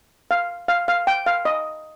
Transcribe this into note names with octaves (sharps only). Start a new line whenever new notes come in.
F5
F5
F5
G5
F5
D#5